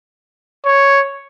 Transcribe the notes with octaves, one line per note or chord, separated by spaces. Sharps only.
C#5